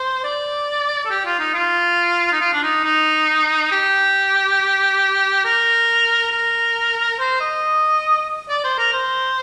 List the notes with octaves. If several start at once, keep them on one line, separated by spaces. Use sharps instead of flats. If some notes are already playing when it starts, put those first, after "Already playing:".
Already playing: C5
D5
A4
G4
F4
D#4
F4
D#4
F4
D4
D#4
D#4
G4
A#4
A#4
C5
D#5
D5
C5
A#4
C5